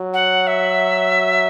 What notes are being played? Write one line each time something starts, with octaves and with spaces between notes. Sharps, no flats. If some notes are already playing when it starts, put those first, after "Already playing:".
Already playing: F#3
F#5
E5